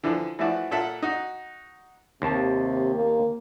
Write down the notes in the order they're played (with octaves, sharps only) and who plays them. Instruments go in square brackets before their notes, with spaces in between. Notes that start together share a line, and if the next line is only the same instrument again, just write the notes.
[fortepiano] D3 E3 F3
E3 F3 A3 E4 F#4 D5
A#2 A4 E5 F#5
D#4 F#4
[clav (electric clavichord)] D#2 A5 [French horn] C3
[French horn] A#3